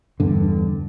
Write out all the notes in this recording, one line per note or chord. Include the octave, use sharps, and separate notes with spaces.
E2 G2 D3